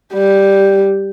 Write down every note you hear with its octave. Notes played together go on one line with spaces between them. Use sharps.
G3